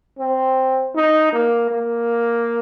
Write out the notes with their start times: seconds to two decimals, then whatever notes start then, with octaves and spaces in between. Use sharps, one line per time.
0.19 C4
0.95 D#4
1.33 A#3
1.71 A#3